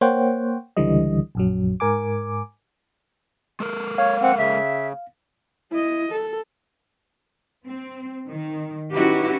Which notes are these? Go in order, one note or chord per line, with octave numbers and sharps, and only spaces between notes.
A#3 C5 C#5 F#5 G5
C#2 D3 E3 G3 D#5
A#1 F#2 F#3
G#2 A#4 G#5 D6
G#3 A4 A#4
C#5 F5
C4 F#5
C#3 E5
E4 D#5
A4
C4
D#3
C#4 D#4 E4 F#4 G4 B4